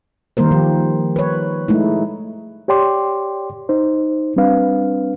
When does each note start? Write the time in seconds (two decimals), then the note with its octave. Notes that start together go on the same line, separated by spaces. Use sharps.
0.37 D#3 G3 A#3 A#4 C5
0.51 D#3 F3 G4
1.16 B4 C#5
1.68 G#3 A3 D#4 E4
2.68 G4 C#5 D5 G5 C6 D6
3.69 D#4 C5
4.36 G3 C4 D4 B4 F5